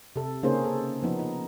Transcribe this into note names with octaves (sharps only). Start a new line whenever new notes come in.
C3 A4
C#3 A#3 C#4 D#4 G#4 C5
A4
F3 B3 D#4
D#4